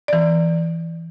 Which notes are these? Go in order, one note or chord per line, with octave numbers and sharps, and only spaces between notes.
E3 D5